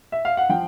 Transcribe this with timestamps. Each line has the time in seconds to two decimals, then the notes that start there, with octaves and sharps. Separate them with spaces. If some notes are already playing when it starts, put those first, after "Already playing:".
0.12 E5
0.25 F5
0.37 F#5
0.49 F3 G5